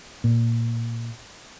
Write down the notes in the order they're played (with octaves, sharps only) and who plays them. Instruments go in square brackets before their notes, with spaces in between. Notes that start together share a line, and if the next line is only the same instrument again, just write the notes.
[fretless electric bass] A#2